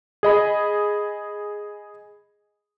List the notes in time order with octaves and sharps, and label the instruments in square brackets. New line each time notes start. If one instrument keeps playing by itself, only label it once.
[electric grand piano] G#4 D#5 B5